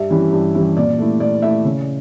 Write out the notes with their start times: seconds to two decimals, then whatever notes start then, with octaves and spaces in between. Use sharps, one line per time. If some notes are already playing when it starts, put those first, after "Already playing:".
Already playing: G2 E5
0.10 E3 G3 C#4 E4
0.32 G2
0.55 E3 G3 C#4 E4
0.77 A#2 D5
0.99 A3 E4
1.20 A#2 D5
1.42 A3 E4 E5
1.65 C#3